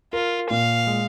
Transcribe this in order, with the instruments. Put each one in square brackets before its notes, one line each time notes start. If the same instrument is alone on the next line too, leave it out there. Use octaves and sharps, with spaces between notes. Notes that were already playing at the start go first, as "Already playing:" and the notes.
[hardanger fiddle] F4 [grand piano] A#4
[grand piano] A#2 [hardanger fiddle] F5
[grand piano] G#3